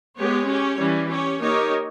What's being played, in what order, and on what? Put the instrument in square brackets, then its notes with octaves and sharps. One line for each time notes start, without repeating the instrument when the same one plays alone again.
[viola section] G#3 B3 G4 C#5
C#4 G4 C#5
E3 G3 C#4
C#4 G4 C#5
A#3 D#4 G4 A#4 C#5